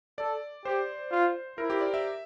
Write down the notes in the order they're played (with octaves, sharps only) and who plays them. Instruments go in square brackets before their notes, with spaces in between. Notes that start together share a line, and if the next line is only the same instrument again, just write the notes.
[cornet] A4 [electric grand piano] D5
[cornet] G4 [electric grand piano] C5
[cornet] F4
[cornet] E4 [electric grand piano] A#4
[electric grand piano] G4
D5
E5